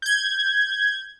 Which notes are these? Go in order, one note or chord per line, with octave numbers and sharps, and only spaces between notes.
G6 G#6